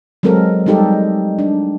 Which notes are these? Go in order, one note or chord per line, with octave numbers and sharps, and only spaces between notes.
F#3 G#3 C4 A4 A#4
G3 G#3 D#4 G4 A4
D4